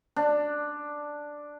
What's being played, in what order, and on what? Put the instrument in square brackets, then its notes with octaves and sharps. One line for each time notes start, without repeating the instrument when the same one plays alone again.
[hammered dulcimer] D4